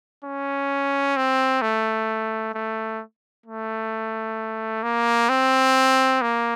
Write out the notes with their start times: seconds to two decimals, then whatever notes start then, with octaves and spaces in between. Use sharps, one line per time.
0.25 C#4
1.17 C4
1.62 A3
2.55 A3
3.46 A3
4.83 A#3
5.29 C4
6.22 A#3